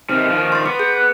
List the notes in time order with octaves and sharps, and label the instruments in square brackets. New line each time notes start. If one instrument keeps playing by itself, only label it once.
[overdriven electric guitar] C3 D#3 [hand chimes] D#4 [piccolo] F6
[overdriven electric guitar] D#3 F3
[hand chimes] C6 A6
[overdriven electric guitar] B3 [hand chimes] D6
[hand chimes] G#4 [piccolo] G6
[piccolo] F#6